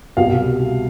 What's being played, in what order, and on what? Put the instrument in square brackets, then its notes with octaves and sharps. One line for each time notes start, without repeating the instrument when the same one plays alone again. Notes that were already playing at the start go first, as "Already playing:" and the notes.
[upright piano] C2 B2 G3 F5